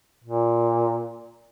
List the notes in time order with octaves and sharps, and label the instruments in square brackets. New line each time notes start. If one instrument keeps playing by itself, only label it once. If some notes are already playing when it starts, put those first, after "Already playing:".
[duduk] A#2